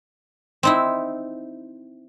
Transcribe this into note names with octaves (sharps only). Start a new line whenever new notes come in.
C4 D#4 E4